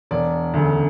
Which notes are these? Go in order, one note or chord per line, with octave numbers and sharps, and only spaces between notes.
E1 D5
D2 C#3